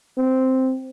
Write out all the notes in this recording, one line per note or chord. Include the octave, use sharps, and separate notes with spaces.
C4